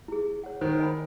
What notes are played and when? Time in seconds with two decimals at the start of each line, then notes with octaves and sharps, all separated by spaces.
0.08 E4 G#4
0.25 G#4
0.44 C#5 F#5
0.61 D#3 C5
0.79 D#5 G#5 B5